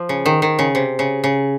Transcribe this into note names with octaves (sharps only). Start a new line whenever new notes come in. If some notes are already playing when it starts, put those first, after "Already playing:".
Already playing: F3
C#3
D#3
D#3
C#3
C3
C#3
C#3